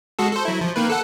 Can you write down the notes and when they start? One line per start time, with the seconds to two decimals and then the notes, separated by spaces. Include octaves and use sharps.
0.19 G#3 F#4 A4
0.33 A4 C5
0.45 F#3 E4
0.61 F3
0.76 D#3 A#3 B4
0.90 A4 F#5